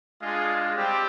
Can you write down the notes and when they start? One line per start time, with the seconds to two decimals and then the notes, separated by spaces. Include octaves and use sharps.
0.21 G#3 D4 F4 G#4
0.74 G3 C4 G4